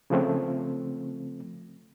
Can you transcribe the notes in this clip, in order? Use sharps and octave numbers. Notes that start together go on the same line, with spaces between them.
C#3 F3 A3 C4